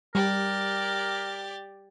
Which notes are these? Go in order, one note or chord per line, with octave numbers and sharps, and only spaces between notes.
G3 G4 A#4 D5